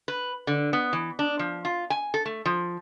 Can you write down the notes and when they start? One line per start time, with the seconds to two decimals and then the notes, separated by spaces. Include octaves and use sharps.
0.08 B4
0.47 D3
0.73 B3
0.93 E3
1.19 D4
1.39 F3
1.65 F4
1.90 G#5
2.14 A4
2.26 A3
2.46 F3